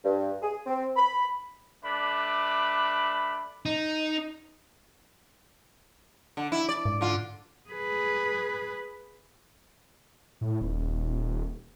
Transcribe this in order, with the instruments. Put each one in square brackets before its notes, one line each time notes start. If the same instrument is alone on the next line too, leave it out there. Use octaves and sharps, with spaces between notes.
[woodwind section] G2
G#4
C4
B5
[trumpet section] A3 D4 B4 B5 D6
[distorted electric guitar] D#4
[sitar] D3
E4
D5
[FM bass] G#2
[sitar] D3 F4
[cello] G#4 B4
[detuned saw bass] A2
D#1